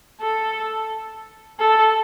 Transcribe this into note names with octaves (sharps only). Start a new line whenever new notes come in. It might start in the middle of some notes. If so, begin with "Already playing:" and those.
A4
A4